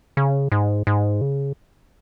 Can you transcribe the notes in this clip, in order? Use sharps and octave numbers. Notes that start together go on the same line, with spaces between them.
C#3
G#2
G#2
C#3